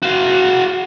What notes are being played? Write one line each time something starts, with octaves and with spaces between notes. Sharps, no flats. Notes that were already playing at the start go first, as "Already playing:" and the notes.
F#4 F5